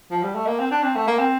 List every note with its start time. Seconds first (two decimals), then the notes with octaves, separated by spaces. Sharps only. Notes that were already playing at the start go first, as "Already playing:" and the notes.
0.11 F3
0.23 G3
0.35 A3
0.47 A#3
0.59 C4
0.71 D4
0.83 C4
0.95 A3
1.07 A#3
1.19 C4